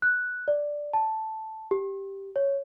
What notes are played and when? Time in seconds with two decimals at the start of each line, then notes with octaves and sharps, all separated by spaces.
0.02 F#6
0.48 D5
0.93 A5
1.71 G4
2.36 C#5